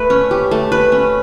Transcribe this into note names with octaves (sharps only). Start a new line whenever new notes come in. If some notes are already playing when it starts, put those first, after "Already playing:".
Already playing: A3 B4
C#4
G4
A3
B4
C#4